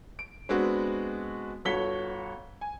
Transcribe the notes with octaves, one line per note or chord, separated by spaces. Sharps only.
D7
G#3 B3 C4 D4 F#4
G1 F#4 A4 C#5 B6 G7
G#5